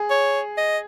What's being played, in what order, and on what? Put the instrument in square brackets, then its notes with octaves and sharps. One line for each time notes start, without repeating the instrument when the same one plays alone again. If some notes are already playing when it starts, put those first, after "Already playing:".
Already playing: [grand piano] G#4
[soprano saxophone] C#5
D#5